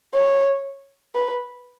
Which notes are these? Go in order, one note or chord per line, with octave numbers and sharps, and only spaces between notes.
C#5
B4